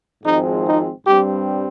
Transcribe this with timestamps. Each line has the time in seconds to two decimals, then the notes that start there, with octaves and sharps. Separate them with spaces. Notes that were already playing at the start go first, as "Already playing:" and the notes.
0.24 G#1 G#2 F3 G#3 C4 D#4
0.64 D#4
1.06 G2 G3 C4 G4